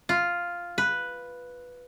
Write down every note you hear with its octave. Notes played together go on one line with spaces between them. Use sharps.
F4
B4